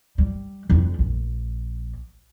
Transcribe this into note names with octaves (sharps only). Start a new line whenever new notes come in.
G3
F2 D3
A#1